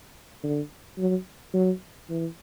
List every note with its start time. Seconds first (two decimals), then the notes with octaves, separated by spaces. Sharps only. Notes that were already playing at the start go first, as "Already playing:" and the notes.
0.43 D3
0.98 F#3
1.54 F#3
2.10 E3